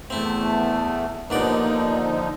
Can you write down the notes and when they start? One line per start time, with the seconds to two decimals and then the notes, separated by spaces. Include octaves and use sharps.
0.10 E2 A3 C4 E4
1.30 D#2 D3 F3 B3 D#4 D5